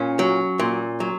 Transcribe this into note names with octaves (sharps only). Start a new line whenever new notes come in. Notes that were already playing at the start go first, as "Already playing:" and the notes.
Already playing: A#2 C#4
F#3
A#2
F#3